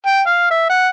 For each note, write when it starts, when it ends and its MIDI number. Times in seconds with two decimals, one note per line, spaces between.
0.06 0.21 79
0.27 0.48 77
0.51 0.65 76
0.70 0.88 78